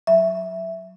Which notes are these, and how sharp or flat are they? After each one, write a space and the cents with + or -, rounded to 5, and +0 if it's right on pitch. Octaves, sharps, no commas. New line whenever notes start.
F#3 +0 E5 +0